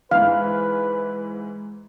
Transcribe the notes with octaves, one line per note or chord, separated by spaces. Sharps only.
G#2 E3 B4 F5